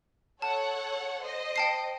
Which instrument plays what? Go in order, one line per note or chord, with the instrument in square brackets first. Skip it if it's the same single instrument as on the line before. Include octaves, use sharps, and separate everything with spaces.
[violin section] A4 C#5 F#5 [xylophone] A5
[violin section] C5 D#5
[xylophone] G5 A5 C7